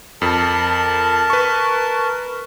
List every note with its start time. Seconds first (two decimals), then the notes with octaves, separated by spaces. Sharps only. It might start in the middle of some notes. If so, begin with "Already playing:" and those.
0.22 F2 A#4 A5
1.30 B4 C#6